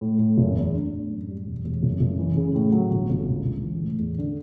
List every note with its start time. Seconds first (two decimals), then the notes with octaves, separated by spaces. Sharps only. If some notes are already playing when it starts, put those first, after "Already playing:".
0.01 A2
0.19 A2
0.38 F#1
0.56 E2
0.74 D4
0.92 A2
1.10 F#2
1.28 G3
1.46 E1
1.64 E1
1.83 F#1
2.00 F#1
2.19 E3
2.37 C#3
2.55 A2
2.72 F#3
2.91 G1
3.09 G1
3.28 C#2
3.45 C#2
3.63 E3
3.81 A2
3.99 E2
4.18 D3